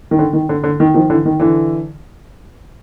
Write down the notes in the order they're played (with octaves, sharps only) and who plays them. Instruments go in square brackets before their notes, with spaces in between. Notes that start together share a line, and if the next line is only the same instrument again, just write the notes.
[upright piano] D#3
D3
D#3
D3
D3
D#3
D#3 F3
D3 E3
D#3
D3 E3